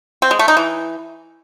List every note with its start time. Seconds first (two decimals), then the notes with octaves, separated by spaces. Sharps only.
0.22 C4
0.31 G#3
0.39 A3
0.48 D#4
0.57 E3